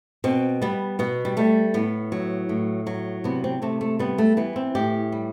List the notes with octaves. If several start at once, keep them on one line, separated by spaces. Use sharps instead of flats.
B2 C4
G3 B3
B2 B3
G3
G3 A3
A2 B3
F#3
A2
F#3
C3 B3
C4
C3 A3
A3
G3 B3
A3
E3 B3
C4
A2 G4
G3